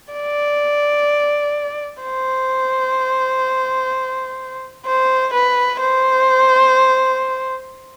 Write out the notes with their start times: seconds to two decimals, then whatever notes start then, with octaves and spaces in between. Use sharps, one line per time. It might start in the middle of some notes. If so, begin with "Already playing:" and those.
0.13 D5
2.03 C5
4.86 C5
5.33 B4
5.80 C5